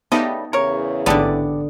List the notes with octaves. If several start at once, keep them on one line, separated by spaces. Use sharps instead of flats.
C#3 G3 A3 B3 D#4 G4 D#5
E2 C#3 A#4 C#5
A1 G#2 D3 B3 G4 A4 D5